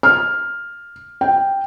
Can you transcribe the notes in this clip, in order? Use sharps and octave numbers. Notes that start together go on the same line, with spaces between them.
F6
G5